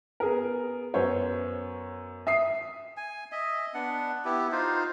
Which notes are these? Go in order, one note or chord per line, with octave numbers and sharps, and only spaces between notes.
B3 G#4 A#4
F#2 B3 C5 C#5
E5 D#6 C7
G#5
D#5 E5
B3 D4 F#5
B3 E4 G4
D#4 F4 C5